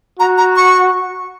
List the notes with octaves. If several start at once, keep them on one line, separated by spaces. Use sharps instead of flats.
F#4 A#5
A#5
C#6